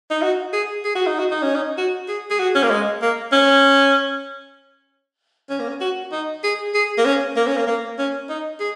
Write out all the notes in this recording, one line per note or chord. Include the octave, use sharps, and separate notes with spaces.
D#4
F#4
G#4
G#4
F#4
D#4
F#4
D#4
C#4
D#4
F#4
G#4
G#4
F#4
C#4
A#3
G#3
A#3
C#4
C#4
A#3
C#4
F#4
D#4
G#4
G#4
A#3
C#4
A#3
C#4
A#3
A#3
C#4
D#4
G#4